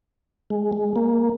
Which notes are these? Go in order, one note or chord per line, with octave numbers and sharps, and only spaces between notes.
G#3
G#3
A#3